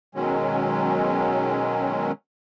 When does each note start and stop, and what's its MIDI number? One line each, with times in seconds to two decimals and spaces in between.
0.15 2.12 47
0.15 2.12 51
0.15 2.12 54
0.15 2.12 56
0.15 2.12 61